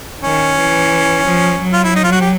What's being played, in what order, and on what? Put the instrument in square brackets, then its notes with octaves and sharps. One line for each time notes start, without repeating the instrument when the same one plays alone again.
[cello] D#3 [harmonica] C#4
[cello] E3
F3
F#3
[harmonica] F4
E4
D#4
F4
F#4
G4